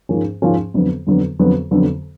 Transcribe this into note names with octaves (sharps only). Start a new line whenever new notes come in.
G#2 F3 A#3 C#4
G#2 F3 A#3 C#4
F2 D3 F#3 B3
F2 D3 F#3 B3
F2 D3 F#3 B3
F2 D3 F#3 B3